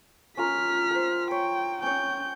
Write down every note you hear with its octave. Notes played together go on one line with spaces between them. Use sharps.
C#4 F4 A#4 F6 B6
A#4 C5
C#5 G5
C#4 C#5 G5 G6